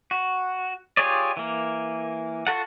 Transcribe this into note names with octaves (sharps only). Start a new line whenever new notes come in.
F#4
F4 G4 G#4 C#5 D5
E3 A#3
F4 F#4 A4 F#5